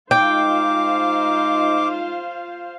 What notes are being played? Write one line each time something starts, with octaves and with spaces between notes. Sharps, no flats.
G#3 D#4 F4 C5 F5 G5 D6